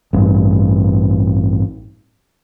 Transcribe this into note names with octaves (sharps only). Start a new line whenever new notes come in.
A1 G2